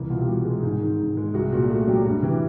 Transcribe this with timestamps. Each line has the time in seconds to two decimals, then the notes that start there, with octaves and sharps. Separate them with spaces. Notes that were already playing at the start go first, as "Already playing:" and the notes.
Already playing: C2 E3
0.09 B2 F4
0.21 G4
0.27 C2 F#4
0.45 G#3
0.63 G#2
0.81 D#3
0.99 G#2
1.17 G#3
1.34 C2 F#4
1.52 A#2 F#4
1.70 A3 F#4
1.87 F#3 G4
2.06 G2 F#4
2.23 E3 G4